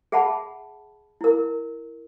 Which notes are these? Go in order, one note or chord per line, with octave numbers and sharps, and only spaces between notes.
G#4 E5 F#5 A5 B5
E4 A#4